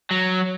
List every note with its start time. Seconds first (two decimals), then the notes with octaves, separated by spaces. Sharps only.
0.11 F#3